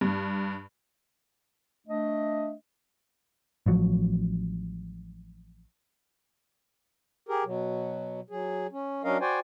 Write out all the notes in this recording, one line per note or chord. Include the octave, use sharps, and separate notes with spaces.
G2
A3 D4 D#5
A1 F3 F#3
G4 G#4 A#4
B2 F#3
F#3 G#4
C#4
F#3 C#4 D4 A#4 D#5 F5
F#4 C5 D5 G5 G#5